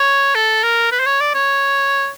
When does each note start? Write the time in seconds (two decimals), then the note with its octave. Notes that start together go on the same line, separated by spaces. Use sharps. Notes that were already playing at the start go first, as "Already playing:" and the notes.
Already playing: C#5
0.35 A4
0.63 A#4
0.92 B4
1.00 C5
1.06 C#5
1.21 D5
1.34 C#5